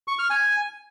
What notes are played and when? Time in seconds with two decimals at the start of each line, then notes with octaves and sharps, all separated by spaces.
0.08 C#6
0.19 F6
0.30 G#5